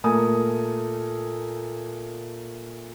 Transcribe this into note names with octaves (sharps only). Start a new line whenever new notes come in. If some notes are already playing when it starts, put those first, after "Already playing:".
A#2 A3 A4 A#4 G#5 D#6